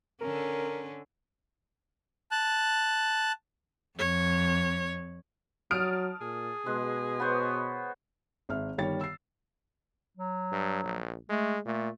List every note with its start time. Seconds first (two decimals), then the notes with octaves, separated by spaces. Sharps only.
0.21 D3 C#4 A#4
2.31 A5 F#6
3.99 F2 C#5
5.71 F#3 A5 D#6 F6 D7
6.21 A#2 G#4
6.66 B2 G#3
7.20 B3 C5 C#5
8.49 G#1 E5 F6
8.78 G1 D#3 G3 C#5 A6
9.01 E6 C7
10.17 F#3
10.52 G2
10.84 A#1
11.30 G#3 A3
11.65 A#2 A3